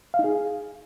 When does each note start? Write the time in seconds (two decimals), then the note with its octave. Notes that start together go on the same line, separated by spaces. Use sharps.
0.14 F5
0.19 D#4
0.24 G#4